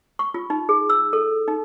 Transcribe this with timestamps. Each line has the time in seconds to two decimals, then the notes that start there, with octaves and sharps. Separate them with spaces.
0.19 C#6
0.34 F4
0.50 D#4
0.69 G#4
0.90 E6
1.13 A4
1.48 D#4